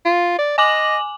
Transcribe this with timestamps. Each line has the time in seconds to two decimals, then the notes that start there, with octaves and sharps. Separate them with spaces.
0.06 F4
0.39 D5
0.58 D#5 G#5 D6 F#7